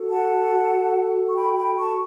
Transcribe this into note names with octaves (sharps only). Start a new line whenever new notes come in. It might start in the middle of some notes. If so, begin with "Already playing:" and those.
Already playing: F#4 A4
F#5 A5
C#6
G5 B5
G5 B5
A5 C#6